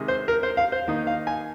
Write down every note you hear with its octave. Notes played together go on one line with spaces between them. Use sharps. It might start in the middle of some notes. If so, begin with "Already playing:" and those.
Already playing: C3 D#3 G#3
C5
A#4
C5
F5
C5
D#3 A#3 D#4
F5
G#5